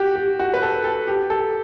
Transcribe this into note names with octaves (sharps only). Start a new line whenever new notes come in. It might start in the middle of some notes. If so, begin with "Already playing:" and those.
Already playing: F#4 G4
G4
F#4
B4
A4
A4
G4
A4